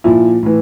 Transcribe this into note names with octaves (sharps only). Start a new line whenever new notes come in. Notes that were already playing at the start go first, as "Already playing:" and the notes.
A#2 F3 E4
A2 E3